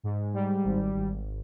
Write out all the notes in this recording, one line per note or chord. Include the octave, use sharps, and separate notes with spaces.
G#2
G3
G#1
G#1